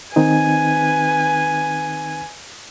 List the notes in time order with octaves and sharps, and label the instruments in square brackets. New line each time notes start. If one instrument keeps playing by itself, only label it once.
[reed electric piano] D#3 C4 D#4 [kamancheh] B4 G#5